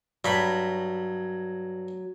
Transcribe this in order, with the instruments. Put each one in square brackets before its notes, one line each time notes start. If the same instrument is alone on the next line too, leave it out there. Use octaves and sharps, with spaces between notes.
[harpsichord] G2 B5 [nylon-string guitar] F#3